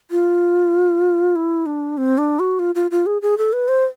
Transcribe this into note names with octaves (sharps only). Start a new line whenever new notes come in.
F4
E4
D4
C4
D4
F#4
F4
F4
F4
G#4
G#4
A4
B4
C5